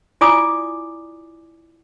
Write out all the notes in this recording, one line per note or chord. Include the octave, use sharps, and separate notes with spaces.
E4 F4 D5 G#5 D6 D#6